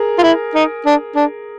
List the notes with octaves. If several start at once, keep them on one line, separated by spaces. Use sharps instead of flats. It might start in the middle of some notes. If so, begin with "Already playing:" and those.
Already playing: G#4 A#4
F4
E4
D#4
D4
D4